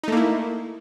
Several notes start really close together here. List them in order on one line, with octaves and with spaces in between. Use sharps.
D#4 A3 A#3 E4